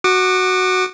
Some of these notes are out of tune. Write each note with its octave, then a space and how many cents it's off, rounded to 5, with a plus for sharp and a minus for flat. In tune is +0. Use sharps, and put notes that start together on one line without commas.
F#4 +0 F#5 +0 D6 +35